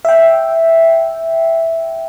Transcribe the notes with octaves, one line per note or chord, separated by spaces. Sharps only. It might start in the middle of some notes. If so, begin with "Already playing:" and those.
E5 G5